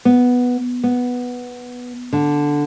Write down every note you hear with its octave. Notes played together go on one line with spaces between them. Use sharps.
B3
B3
D3